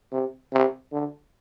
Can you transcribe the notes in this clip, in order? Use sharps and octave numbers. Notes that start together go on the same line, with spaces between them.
C3
C3
D3